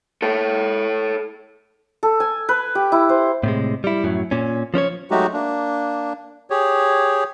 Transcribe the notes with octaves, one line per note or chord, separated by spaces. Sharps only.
A4 C#5
A4
G#5
B4
G4
E4
C5
A2 C3 G#3
G3 E4
F#2 A2 F#3
A#2 C#4
F3 C#4 C5 C#5
F#3 G#3 A3 D#4 F#4 G4
A#3 D4
G4 G#4 C#5